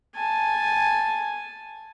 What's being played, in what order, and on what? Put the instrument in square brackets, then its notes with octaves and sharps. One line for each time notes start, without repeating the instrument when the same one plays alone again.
[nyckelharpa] G#5 A5